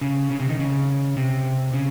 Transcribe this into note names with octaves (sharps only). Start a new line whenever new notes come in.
C#3
C#3
C3
D#3
C#3
C3
C#3